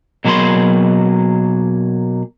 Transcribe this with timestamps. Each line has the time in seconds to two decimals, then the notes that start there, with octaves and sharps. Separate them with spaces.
0.25 B2 F#3 A#3 G#4 B5 C6